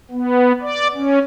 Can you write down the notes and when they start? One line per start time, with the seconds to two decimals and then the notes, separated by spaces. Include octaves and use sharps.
0.11 B3
0.61 D5
0.95 C#4